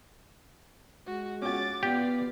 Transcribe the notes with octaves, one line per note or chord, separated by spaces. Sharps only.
G#3 F#4
C#4 F#4 D6 A6
B3 F4 G4 D5